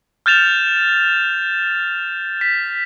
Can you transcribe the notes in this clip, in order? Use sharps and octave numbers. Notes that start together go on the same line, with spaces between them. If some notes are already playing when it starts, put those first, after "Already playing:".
F6 G6 A6 E7 F7
B6